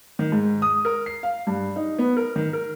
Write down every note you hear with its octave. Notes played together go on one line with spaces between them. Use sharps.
D#3
G#2
D#6
A#4
C7
F5
G2
D#4
B3
A#4
D#3
A#4